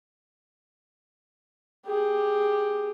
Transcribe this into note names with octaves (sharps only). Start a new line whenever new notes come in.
G4 G#4